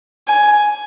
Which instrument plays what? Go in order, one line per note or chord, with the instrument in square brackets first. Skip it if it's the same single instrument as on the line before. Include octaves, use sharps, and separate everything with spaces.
[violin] G#5